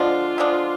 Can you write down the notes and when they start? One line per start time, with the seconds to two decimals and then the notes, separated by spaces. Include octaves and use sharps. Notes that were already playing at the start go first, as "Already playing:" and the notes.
Already playing: D3 F3 G#3 D4 F4
0.38 D3 F3 G#3 D4